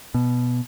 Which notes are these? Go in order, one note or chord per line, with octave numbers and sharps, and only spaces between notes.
B2